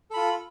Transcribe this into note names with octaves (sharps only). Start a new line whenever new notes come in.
F4 A4 B5